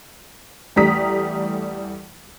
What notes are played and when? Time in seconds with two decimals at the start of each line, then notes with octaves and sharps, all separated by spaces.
0.76 E2 G3 A3 A#5 D#6 B6